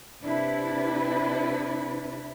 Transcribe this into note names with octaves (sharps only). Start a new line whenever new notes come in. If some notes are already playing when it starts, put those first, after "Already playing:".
C3 D4 E4 B4